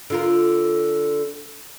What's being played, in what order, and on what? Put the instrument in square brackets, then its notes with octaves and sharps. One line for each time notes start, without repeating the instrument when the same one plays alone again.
[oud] D3 F4 A#4